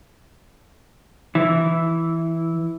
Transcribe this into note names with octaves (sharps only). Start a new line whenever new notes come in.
E3 E4